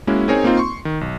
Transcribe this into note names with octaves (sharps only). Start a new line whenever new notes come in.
G#3 A#3 C#4 E4 F#4
C4 D#4 G#4 A#4 C#5 G#5
A#3 C4 D#4 F4
C6 C#6
D#3
B1